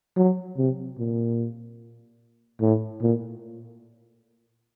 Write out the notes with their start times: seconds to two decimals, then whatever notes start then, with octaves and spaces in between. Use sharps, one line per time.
0.17 F#3
0.57 C3
0.98 A#2
2.61 A2
3.01 A#2